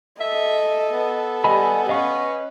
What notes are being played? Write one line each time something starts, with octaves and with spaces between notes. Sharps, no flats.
A4 D#5 E5
B3
G3 D#5 G#5 B5
C#4 B4 D#5 F5 C#6